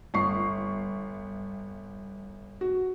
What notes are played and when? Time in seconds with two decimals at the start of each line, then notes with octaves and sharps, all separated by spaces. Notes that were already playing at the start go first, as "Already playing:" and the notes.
0.14 G1 C#6 C7
2.61 F#4